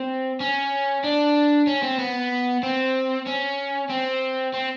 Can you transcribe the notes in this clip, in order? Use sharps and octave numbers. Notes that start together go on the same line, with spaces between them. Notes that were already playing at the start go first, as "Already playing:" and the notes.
Already playing: C4
C#4
D4
C#4
C4
B3
C4
C#4
C4
C4